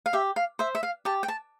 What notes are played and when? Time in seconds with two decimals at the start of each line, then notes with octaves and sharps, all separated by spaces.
0.06 F5
0.13 G4 E5
0.36 F5
0.59 C5 E5
0.75 E5
0.83 F5
1.05 G4 A5
1.23 G5
1.28 A5